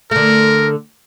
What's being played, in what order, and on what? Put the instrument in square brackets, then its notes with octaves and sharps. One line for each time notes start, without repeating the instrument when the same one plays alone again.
[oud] D3 A3 [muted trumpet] A#4